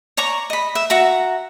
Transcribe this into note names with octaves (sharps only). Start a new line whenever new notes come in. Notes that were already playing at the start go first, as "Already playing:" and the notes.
C#5 D5 A#5 C#6
D#5 B5
E5
F#4 E5 A#5